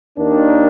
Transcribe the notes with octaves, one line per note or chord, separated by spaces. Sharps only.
D#2 D#3 A#3 D4